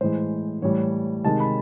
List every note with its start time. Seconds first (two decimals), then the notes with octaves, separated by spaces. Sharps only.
0.01 A2 E3 G#3 C5
0.62 A2 E3 G3 C#5
1.24 C3 D#3 G#3 A5
1.40 B5